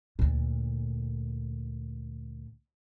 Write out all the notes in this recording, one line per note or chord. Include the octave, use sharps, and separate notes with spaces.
D2 A#2